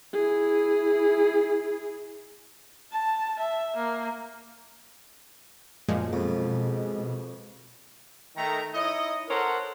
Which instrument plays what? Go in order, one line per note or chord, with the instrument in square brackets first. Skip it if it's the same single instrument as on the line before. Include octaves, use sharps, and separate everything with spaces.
[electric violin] E4 G#4
[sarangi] A5
E5
A#3
[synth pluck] F#2 A#2 F3 [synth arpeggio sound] G#3
[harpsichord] F2 [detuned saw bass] B2
[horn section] D#3 A3 A#5
D#4 E4 C#5 D#5
A4 A#4 C5 C#5 F#5